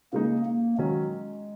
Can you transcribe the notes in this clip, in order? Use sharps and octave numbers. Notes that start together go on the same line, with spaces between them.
C#3 G#3 A#3 D#4
A#3
D#3 F#3 G#3 C#4